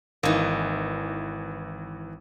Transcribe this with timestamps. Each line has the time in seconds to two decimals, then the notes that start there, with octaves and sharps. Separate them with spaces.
0.23 G#1 E3 A#3 D#4